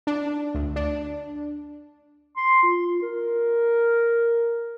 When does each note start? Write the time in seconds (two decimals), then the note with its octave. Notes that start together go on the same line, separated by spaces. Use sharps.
0.07 D4
0.54 D2
0.76 D4
2.37 C6
2.63 F4
3.02 A#4